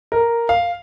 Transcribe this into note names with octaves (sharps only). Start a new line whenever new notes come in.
A#4
F5